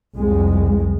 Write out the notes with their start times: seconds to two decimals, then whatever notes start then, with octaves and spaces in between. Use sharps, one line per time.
0.15 C2 F2 G#3